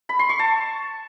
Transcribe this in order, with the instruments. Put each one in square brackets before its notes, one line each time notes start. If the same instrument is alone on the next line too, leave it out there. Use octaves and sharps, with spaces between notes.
[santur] B5
C6
C#6
A5